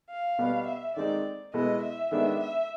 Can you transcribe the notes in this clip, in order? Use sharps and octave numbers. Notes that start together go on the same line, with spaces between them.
F5
B2 G3 B3
E5
D#3 G#3 C4 D#4 D5
B2 G#3 B3 E4 D#5
E5
D#3 G#3 B3 D4 E5
E5